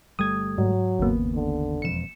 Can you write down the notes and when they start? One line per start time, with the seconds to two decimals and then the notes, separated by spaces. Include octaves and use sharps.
0.19 G1 G3 A3 D#6 G#6
0.58 G#2 F#3
0.99 G1 D#2 C#3 A#3 B3
1.35 D3
1.82 E1 F2 C#7 E7